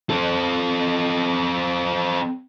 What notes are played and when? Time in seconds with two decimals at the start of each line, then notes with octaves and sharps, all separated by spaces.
0.10 C4 A4